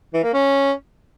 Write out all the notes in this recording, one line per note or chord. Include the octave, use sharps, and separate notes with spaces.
E3
A#3
C#4